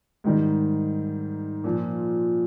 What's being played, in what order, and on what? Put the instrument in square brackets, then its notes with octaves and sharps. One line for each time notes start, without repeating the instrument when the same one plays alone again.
[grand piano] G#2 D#3 G3
A#2 F3